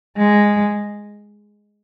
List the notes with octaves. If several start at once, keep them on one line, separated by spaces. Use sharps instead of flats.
G#3